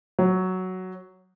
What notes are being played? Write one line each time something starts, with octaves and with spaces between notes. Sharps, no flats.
F#3